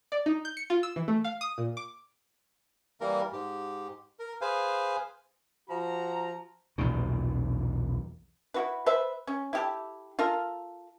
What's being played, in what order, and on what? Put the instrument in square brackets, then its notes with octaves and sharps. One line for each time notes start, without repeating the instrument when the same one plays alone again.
[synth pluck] D5
D#4
G6
C#7
F4
E6
E3
A3
F5
D#6
A#2
D6
[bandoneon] E3 G3 A#3 A#4
G#2 G4
A#4
G#4 B4 C5 F5 G#5
[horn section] F3 F#4 A#5
[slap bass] B1 E2 A#2 D#3
[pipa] E4 F#4 B4
B4 C5 E5
C#4
E4 G4 A4
F4 A4 A#4